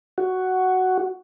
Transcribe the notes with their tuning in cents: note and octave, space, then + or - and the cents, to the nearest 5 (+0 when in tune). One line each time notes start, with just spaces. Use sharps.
F#4 +5